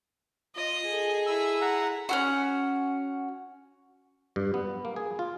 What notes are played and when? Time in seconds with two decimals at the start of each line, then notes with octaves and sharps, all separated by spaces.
0.55 F4 D#5
0.85 G#4 A4
1.26 E4 E6
1.62 F#5 A#5
2.09 C#4 E4 F#4
4.36 G2
4.54 B3
4.85 A#3
4.96 G#4
5.19 F4